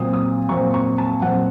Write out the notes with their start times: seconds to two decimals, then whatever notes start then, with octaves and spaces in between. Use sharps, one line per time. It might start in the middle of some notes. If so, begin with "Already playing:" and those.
Already playing: A#2 F#3 C4 D#6
0.13 D#6
0.49 A#2 F#3 C4 C#6
0.74 C#6
0.98 A5
1.22 A#2 F#3 C4 F#5